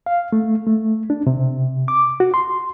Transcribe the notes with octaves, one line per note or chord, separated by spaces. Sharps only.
F5
A3
A3
D4
C3
D6
F#4
C6